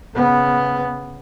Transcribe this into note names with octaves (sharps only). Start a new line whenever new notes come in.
C#3 B3